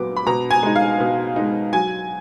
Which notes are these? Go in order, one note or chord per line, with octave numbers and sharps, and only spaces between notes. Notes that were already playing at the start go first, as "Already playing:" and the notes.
Already playing: A#2 F#3 B3 D6
B5
B2 A#5
G#5
G#3 D#4
F5
B2
G#3 D#4
F#3 G#5